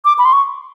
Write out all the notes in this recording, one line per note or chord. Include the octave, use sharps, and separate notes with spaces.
D6
B5
C6
C#6